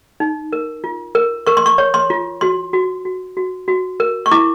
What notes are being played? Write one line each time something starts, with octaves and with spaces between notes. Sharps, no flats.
D#4
A#4
F4
A#4
A#4 C#6
C6
C#6
C#5
C6
F4
F#4 C6
F#4
F#4
F#4
F#4
A#4
C#6
E4 D6